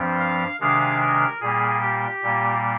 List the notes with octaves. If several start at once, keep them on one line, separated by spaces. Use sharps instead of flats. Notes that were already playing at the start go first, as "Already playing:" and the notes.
Already playing: G2 F3 C4
F5
C3 D#3 G#3 D4 F5
A#4
A#2 G3 A#3 G#4
G4
A#2 G3 A#3